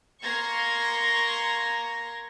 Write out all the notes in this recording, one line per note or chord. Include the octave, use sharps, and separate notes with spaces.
A#3 A#5 C6 C#6 G#6 A#6